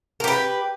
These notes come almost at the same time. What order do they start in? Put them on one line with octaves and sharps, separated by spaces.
A#4 G4 B4